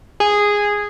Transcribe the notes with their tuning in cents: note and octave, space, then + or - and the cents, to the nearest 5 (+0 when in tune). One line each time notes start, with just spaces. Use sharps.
G#4 -10